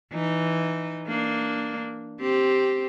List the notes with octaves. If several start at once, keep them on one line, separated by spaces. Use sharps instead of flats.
E3 D#4
A#3 D4
C4 G4